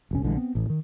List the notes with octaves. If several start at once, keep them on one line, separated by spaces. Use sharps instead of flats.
E1 C2 C#4
A#1 D3 E3 G#3
B3 C4
A1 A2
D#3